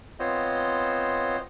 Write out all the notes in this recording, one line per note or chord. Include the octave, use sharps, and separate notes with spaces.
B3 C4 F4 C5 C#5 D#5